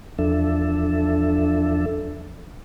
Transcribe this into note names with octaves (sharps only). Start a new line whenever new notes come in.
E2 F3 D4 A4 E5